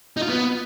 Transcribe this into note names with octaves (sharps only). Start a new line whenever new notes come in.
D#4
F4
B3